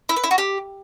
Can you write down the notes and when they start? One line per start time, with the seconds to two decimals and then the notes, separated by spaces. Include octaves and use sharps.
0.09 E4
0.16 B4
0.24 E4
0.31 F#4
0.38 G4